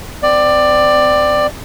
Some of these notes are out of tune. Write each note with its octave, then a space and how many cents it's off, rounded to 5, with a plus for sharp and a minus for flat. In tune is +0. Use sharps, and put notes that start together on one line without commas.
C4 -25 D5 +15